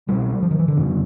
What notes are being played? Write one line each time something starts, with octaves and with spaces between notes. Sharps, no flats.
C2 B2 G3
F3
D#3
E3
D3
F2 C#3